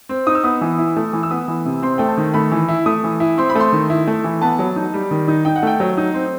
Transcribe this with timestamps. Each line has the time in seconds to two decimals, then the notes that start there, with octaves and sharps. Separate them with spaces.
0.09 C4
0.27 D#4 D#6
0.35 E6
0.44 B3 D#6
0.61 E3
0.78 E4
0.96 A3
1.13 E3
1.23 E6
1.30 B3 D#6
1.48 E3
1.65 C3
1.82 C4 C6
1.98 A3 G5
2.08 A5
2.17 D#3
2.34 A3 B5
2.52 E3
2.68 E4
2.86 A3 D#6
3.04 E3
3.20 E4
3.38 C4 C6
3.50 B5
3.55 A3 C6
3.72 D#3
3.90 E4
4.07 A3
4.24 E3
4.42 B3 A5
4.59 F#3
4.76 D#4
4.94 G3
5.11 D#3
5.28 D#4
5.45 D#4 G5
5.56 F#5
5.63 A3 G5
5.80 F#3
5.97 D#4
6.14 C4